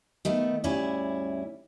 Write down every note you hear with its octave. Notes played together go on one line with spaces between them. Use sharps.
D#3 A3 B3
D2 G2 C#4 E4 D5